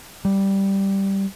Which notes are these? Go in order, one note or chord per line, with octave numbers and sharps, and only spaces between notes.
G3